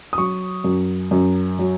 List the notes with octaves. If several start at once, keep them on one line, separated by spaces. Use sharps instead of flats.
D#6
F#3 C#6
F#2
F#2
F#3